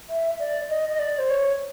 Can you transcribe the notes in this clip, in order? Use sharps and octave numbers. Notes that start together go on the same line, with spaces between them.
E5
D5
D#5
D#5
D5
C5
C#5